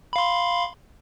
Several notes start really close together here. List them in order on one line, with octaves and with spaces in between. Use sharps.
B5 F5 C6